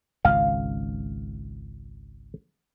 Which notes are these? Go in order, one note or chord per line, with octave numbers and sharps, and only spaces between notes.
G#1 C#2 C#3 F5